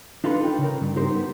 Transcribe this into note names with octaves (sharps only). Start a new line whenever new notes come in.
D4 D#4 F4 A4 B4
F4 G5
C#3 A#4
G2
D#4 G4 A#4 C5
B3